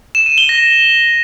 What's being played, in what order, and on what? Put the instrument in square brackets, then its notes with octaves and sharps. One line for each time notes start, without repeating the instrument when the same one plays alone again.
[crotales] E7
D#7
G7
A#6